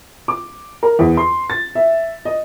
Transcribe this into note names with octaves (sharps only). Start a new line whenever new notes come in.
D6
A#4
E2
C6
A6
E5
D#5